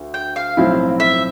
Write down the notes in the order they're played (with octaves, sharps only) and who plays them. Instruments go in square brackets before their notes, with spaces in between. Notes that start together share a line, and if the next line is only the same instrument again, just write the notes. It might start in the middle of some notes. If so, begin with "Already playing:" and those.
Already playing: [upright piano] D2
[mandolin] G5
F5
[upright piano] B1 A2 F3 C4 E4
[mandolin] E5